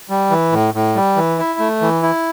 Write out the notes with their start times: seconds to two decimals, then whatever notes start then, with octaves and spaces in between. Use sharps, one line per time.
0.10 G3
0.31 E3
0.52 A2
0.74 A2
0.95 G3
1.17 E3
1.39 E4
1.59 A3
1.81 E3
2.03 E4